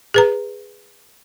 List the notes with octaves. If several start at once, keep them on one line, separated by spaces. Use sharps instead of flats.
G#4 B4 A#5